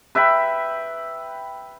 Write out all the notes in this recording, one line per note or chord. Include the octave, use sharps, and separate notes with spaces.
B4 E5 G5 B5